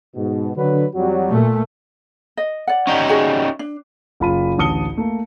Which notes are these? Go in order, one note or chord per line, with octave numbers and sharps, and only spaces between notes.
G#2 B2
D3 F#3 B4
F2 F#3 G3
A#2 A3
D#5
D5 F#5
C#4 D#4 G4
F#4 G#4
D4
F#1 F4 B5 D#7
A1 D2 A5 D#6 C#7 G7
A3 A#3